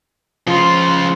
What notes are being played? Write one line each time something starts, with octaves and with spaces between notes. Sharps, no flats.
C#3 F3 F4 C6